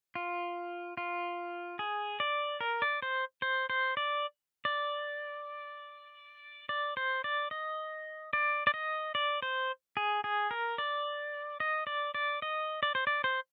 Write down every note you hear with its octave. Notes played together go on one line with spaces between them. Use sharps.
F4
F4
G#4
D5
A#4
D5
C5
C5
C5
D5
D5
D5
C5
D5
D#5
D5
D5
D#5
D5
C5
G#4
G#4
A#4
D5
D#5
D5
D5
D#5
D5
C5
D5
C5